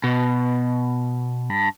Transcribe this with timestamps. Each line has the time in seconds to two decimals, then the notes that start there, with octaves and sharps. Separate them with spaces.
0.04 B2
1.50 G2